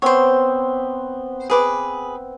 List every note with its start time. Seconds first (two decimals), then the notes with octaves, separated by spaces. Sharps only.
0.02 B3 C4 C5 C#5
1.50 G#4 B4 D6